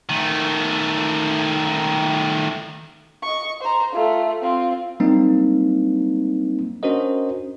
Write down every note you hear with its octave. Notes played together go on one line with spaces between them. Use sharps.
D#3 A3
D#5 C#6
C5 A#5
A3 F4
C4 F4
F#3 G3 A#3 C4 D4 D#4
C#4 D4 F#4 A#4 C5 D#5